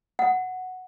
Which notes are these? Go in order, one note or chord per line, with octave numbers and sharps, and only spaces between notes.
F#5